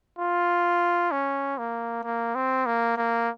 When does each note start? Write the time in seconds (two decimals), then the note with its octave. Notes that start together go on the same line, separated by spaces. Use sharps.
0.19 F4
1.12 C#4
1.58 A#3
2.04 A#3
2.35 C4
2.66 A#3
2.97 A#3